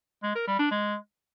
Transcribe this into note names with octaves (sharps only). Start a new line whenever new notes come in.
G#3
A#4
G3
D4
G#3